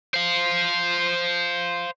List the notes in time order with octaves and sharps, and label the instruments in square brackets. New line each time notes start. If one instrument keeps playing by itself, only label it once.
[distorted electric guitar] C5 F5